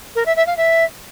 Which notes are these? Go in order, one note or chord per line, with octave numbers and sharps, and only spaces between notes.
A#4
E5
E5
F5
E5